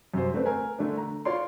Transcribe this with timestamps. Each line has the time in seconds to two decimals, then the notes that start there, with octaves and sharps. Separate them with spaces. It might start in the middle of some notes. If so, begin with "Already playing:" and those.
0.14 F#2 C3 C5
0.34 A3 C4 B4 D5
0.46 A#4 G#5
0.79 D3 A3 D4
0.98 A#5
1.25 F4 C#5 D5 C6